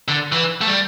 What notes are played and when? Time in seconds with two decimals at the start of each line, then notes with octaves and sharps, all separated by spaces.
0.08 D3
0.32 E3
0.61 A3
0.67 G3